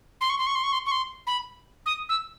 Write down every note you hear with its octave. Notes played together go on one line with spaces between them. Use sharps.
C6
C#6
C6
C#6
C6
C#6
C6
C#6
C6
B5
D#6
E6